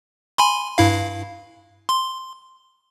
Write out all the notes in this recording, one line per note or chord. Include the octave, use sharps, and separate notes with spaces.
G#5 B5 C6
G2 E4 F5
C6